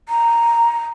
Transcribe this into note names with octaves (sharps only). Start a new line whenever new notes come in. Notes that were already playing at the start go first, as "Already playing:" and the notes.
A#5